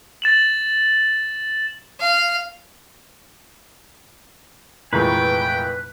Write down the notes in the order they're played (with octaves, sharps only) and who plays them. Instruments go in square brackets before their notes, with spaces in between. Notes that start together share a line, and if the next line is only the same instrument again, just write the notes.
[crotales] A6 E7 F#7
[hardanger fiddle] F5
[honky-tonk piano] F1 A#5 C#6 [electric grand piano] A#2 E3 G#3 [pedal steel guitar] B4 [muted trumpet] G5